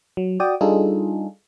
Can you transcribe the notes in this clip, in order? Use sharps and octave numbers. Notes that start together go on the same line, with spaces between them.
F#3
F#4 D5 G5 D#6
G3 D4 D#4 F4 G#4 A4